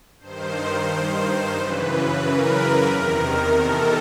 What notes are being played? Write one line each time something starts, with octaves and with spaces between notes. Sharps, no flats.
G2 D#3 C5
F#2 C#3 E3 B4
A#4
E2 C3 D#3
A4